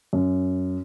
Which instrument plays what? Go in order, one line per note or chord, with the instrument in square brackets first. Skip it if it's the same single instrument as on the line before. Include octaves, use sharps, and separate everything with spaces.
[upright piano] F#2